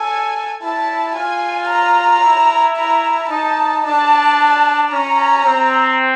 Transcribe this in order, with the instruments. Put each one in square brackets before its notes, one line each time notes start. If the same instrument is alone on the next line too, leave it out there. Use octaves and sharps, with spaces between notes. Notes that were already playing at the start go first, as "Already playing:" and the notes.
Already playing: [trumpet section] A4 [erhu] G#5
[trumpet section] E4 [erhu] A5
[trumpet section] F4 [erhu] G#5
[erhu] A#5
[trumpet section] E4
[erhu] A#5
[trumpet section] D#4 [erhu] A5
[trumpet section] D4 [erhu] A5
[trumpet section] C#4 [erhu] A#5
[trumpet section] C4